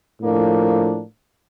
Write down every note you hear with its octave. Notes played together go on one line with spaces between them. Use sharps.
A2 F3 A#3 D4